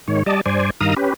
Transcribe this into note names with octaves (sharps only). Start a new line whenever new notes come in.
G#2 D#3 C#5
G3 D5 D#5 A5
G2 C5 D5 G#5
G2 D#3 F5 A#5 D#6
C#4 G4 B4